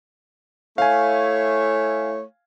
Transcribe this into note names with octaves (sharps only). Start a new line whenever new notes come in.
A3 E4 C#5 F5 G#5